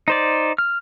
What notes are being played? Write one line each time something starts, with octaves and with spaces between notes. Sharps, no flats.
D#4 C5 D5
F6